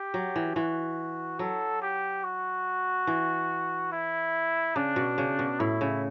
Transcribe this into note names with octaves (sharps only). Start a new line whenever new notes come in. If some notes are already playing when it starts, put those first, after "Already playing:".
Already playing: G4
F#3
E3
E3 F#4
F#3 A4
G4
F#4
E3
E4
C#3 D4
B2
C#3
B2
A2 E4
C#3